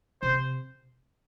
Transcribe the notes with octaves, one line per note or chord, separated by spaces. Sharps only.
C3 C5